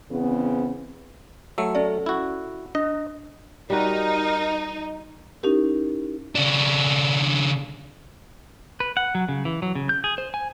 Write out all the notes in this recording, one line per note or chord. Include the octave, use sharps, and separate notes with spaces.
E2 C#3 B3 C4
F#3 A3 E6
C#4 A4 D5
E4 F#4
D4 D#5
G3 D#4 F#4 A#4
C#4 D#4 E4 G4 A#4
C#3 D4
B4
F#5
F#3
C#3
E3
F#3
C#3
G6
G#4
C5
G#5